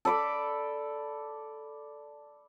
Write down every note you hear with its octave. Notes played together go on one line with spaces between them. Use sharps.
A4 D5 B5 D6